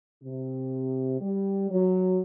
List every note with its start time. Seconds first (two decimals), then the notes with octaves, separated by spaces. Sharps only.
0.23 C3
1.21 G3
1.70 F#3